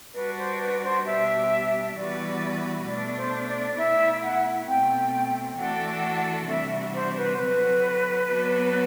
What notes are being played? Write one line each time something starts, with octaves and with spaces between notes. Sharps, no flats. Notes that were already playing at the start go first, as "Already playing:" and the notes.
G3 D4 F#4 B4
C5
B4
C5
B2 G3 D4 G4 E5
E3 G3 B3 F#4 B4 D5
B2 A3 D4 D5
C5
D5
B2 A3 E4 E5
F#5
B2 A3 C4 G5
E3 A3 D4 F#4 A4 F#5
C3 E3 G3 D4 F#4 E5
C5
B4
C5
D3 F#3 C4 F#4 B4
F#3 B3 F#4 A4 D5